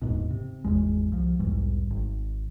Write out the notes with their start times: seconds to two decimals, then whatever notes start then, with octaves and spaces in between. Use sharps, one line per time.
0.02 E1 D#2 G#2 B2
0.31 C3
0.64 G#1 E2 G#3
1.12 C2 F3
1.39 B1 E2 G#2 G3
1.90 G#1